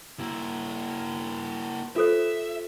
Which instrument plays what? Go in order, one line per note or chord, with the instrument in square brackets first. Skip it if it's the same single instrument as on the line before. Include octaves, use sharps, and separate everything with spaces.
[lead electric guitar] A#3 E4
[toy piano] F4 A4 C5 [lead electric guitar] E5